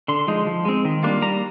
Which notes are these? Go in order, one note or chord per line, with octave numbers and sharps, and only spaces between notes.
D3 C6
F3 G#3 D#4
F3
G#3 C4
D#3
G3 A#3 D4 F4
G3 A#5